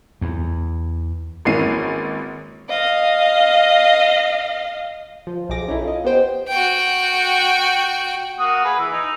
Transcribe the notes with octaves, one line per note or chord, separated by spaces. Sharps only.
E2
G#1 E3 A#3 C#4 C7 D#7
D#5 F5
F3
B1 F3 G#4 D6 A#6
C#4 D#4 E4 A4
F4 D#5
B3 G4 C5 G5
F#4 G5
A#3 F#4 D#6
G#4 B4
E3 E6
D#4